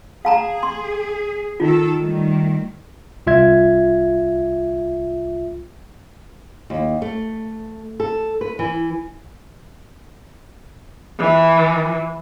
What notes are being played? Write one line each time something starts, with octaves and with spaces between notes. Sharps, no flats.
G#4 F5 A5 A#5
C6
D#3 D#4 F4 A4
D#3 G3 A3
C2 F4 E5 G#6
D#2
A3
A4
B4
E3
E3